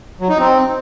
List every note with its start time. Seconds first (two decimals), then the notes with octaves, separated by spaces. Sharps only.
0.21 F#3
0.30 D#4
0.39 C4